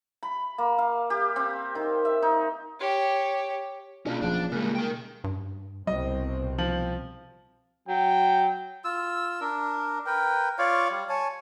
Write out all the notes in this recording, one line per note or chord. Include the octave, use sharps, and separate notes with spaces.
B5
A#3
F5
G4
C4
D#3
E5
D#4
G4 C#5
B2 A#3 C#4 D4 F4 F5
D1 F3 C#4 D4 F4 G#4
C#3 G3 G#3 A#3 F6 F#6
A#4 G5
G2
C2 B2 G3 C4 D#5
F3 F#7
F#3 G5
F4 E6
D4 A#4
A#4 B4 G5
F4 C#5 D5 F5
G3
C#5 G#5 A5